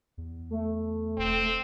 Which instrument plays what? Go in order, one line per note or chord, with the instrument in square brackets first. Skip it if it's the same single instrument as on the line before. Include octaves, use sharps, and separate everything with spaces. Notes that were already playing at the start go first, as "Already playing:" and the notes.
[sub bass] E2
[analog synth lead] A3
[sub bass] E1 [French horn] C4